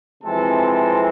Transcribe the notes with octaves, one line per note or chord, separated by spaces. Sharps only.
F2 C3 E3 G#3 C4 A4 A5
A4 A5